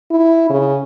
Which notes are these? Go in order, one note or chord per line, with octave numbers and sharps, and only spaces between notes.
E4
C#3